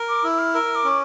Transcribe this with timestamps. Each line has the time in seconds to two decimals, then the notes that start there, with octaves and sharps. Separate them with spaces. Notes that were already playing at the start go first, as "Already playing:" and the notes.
Already playing: A#4
0.09 D6
0.24 E4 E6
0.39 F6
0.54 A#4 E6
0.76 D6
0.84 C#4